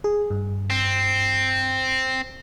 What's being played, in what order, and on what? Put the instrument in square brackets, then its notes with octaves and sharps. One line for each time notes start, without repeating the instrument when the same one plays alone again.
[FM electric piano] G#4
G2
[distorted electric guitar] C4